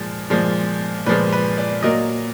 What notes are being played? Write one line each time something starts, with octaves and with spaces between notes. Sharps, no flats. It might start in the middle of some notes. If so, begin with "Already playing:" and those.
Already playing: A#2 F3 G#3
A#2 F3 G#3
A#2 F3 G#3 B4
B4
D5
A#2 F#3 A#3 D#5